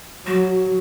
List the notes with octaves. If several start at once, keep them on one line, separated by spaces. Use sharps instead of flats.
F#3 F#4